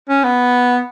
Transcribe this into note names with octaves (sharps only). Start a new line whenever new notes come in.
C#4
B3